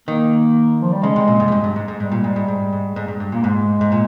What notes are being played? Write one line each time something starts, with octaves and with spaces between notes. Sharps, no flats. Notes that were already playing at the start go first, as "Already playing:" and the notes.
D#3 A#3
F3
G3
C#3 G#3
C3
A#2
G#2
F2
G2
G2
G#2
G#2
G#2 G3
A#2
G#2
G#2
G#2
G#2
G#2
G2
G2
A#2 A#3
G#2 G#3
G#2
A#2